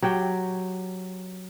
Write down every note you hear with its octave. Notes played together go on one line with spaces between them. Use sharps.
F#3 G4 G5